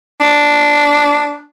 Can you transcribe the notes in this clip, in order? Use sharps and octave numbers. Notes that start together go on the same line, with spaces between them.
D4